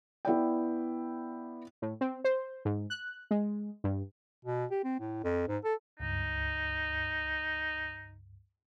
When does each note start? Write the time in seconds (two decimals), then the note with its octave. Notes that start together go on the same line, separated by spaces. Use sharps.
0.25 B3 E4 D5 G5
1.82 A2
2.01 C4
2.24 C5
2.65 G#2
2.90 F#6
3.31 G#3
3.84 G2
4.45 B2
4.71 G4
4.84 C4
5.00 A2
5.24 F2
5.48 G#2
5.64 A4
6.00 C#2 G2 D#4